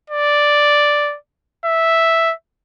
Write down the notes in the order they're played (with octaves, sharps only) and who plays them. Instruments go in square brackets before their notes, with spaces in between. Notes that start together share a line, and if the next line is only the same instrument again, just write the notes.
[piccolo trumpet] D5
E5